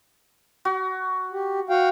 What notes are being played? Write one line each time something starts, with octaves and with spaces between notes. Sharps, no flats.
F#4
G4
F#4 F5 G5